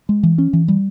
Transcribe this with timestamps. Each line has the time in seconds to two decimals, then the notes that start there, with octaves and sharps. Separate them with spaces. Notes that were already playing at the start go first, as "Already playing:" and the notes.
0.09 G#3
0.23 E3
0.38 C#4
0.53 E3
0.68 G3